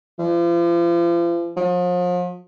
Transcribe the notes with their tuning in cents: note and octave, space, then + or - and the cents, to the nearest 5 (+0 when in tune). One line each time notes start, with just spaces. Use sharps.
F3 -40
F3 +40